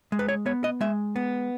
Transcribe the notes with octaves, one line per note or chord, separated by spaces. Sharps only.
G#3
B4
C#5
B3 C#5
D#5
G#3 E5
B3